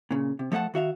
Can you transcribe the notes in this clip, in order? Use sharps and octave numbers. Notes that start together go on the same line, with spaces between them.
A#2 C#3
C3
F3 A3 A4 C5 F#5 A5
D#3 F#4 E5 F5